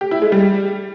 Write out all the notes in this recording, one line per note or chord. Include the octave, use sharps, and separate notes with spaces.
G4
E4
G#3
G3